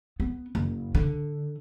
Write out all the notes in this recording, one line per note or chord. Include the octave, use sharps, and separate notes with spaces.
B3
F#1
D3